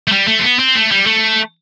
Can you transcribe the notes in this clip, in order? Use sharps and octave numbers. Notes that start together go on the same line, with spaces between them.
A3
G3
A3
C4
B3
C4
A3
G3
A3